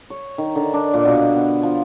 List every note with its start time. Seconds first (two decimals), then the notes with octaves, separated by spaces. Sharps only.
0.10 C#5
0.38 D#3
0.55 D3
0.74 D4
0.94 A#2
1.05 B2
1.36 B3
1.63 F3